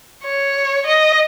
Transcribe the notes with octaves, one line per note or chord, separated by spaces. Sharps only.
C#5
D#5